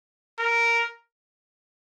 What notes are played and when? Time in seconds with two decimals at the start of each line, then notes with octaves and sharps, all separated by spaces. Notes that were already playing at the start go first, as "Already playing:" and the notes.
0.39 A#4